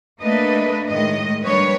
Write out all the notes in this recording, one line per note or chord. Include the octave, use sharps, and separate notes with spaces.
A3 A#3 D4 B4 D#5
A2 D#3 G#3 D#5
F3 G3 A#3 D4 B4 C#5